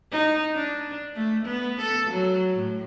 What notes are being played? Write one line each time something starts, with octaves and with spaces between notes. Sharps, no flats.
D#4
D4
A3
B3
A4
F#3
A2